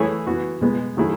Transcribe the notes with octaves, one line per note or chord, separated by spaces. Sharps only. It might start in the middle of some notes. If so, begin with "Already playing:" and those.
Already playing: E3 A3 E4 G#4 C#5
E3 B3 F#4
B2 G#3 B3
D#3 F#3 A3 E4 G#4